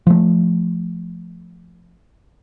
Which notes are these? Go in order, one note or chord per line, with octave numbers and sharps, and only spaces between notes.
F3 A3